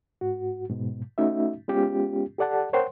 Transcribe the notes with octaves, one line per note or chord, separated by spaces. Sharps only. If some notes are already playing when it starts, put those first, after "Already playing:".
G#2 F#4
G#2 B2
A3 C#4 D#4 F#4 E5
G#3 B3 C#4 F4 G4
G4 A4 D5 F#5 A5
A#4 C5 C#5 F#5 G5 C6